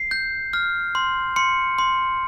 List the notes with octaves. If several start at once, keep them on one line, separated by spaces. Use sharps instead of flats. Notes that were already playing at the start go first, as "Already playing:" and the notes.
Already playing: C7
G6
F6
C6
C6 C#7
C6